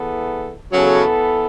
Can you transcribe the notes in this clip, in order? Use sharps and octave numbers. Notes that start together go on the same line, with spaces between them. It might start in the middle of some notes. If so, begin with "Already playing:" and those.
Already playing: E2 E3 B3 A4
C#3 E3 F#3 B3 A4